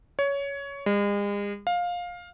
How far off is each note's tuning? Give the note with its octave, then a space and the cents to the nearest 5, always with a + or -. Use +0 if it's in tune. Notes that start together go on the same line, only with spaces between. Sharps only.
C#5 +15
G#3 -40
F5 +15